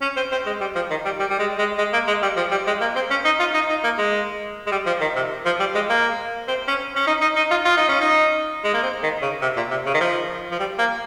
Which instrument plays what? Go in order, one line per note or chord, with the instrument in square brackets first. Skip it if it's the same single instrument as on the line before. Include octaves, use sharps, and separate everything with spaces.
[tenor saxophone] C#4
C4
C4
G#3
G3
F3
D#3
G3
G3
G3
G#3
G#3
G#3
A#3
G#3
G3
F3
G3
G#3
A#3
C4
C#4
D#4
F4
D#4
D#4
A#3
G#3
G#3
G3
F3
D#3
C3
F3
G3
G#3
A#3
C4
C#4
C#4
D#4
D#4
D#4
F4
F4
D#4
C#4
D#4
G#3
A#3
C4
D#3
C#3
C3
A#2
C3
C#3
D#3
F3
F3
G3
A#3